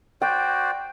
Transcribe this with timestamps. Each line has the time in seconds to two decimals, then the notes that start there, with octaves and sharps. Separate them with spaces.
0.22 F#4 C5 D5 G5